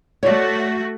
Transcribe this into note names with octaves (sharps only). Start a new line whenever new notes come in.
A3 F#4 C#5 D5